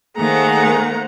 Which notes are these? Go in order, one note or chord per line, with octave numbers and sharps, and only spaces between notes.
D#3 A3 A#3 G#4 C5 F#5 A#5